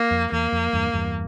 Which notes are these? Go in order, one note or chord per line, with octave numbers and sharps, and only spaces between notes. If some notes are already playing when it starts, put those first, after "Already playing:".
Already playing: A#3
F2
E2 A#3
F2
E2 G2
E2 G2